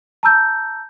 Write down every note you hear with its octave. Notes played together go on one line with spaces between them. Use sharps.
A5 A#5 E6 G6